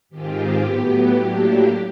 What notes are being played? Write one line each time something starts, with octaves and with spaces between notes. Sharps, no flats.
G#2 D#3 G#3 C4 F4 G4
A2 F#3 B3
A2 F#3 A#3 D4